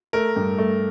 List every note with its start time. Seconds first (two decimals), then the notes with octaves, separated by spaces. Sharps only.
0.13 A3 A#4
0.36 G2
0.58 A3